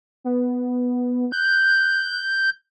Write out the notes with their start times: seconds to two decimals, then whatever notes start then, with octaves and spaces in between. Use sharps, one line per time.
0.24 B3
1.32 F#6 G6